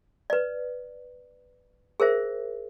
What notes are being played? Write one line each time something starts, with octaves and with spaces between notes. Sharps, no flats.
B4 D5
G#4 A#4 C5 E5